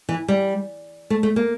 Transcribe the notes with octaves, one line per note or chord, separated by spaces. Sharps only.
E3
G3
A3
A3
A#3